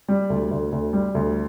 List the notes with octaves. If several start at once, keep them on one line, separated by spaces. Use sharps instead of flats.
G3
D2
D2
D2
G3
D2